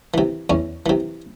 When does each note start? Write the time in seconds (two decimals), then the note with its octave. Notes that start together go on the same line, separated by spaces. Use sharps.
0.14 C3 E3
0.50 E2 C#4
0.86 C3 E3